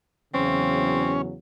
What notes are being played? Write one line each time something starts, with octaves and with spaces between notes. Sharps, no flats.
E2 C#3 F#3 C4 C#4